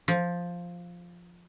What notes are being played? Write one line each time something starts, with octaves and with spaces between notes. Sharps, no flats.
F3